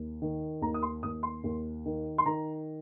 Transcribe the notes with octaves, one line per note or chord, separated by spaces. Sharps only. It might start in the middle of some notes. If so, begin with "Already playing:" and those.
Already playing: D#2
D#3
D#2 A#5
D#6
C6
D#2 D#6
C6
D#2
D#3
C6
D#3 A#5